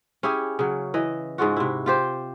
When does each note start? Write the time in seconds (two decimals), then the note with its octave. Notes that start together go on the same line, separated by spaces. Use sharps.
0.23 C#4 E4 G4 G#4
0.59 C#3 F#3
0.94 E3 D#5
1.38 G#2 G#3 F4 F#4
1.57 C3 E4
1.86 F4 G4 C5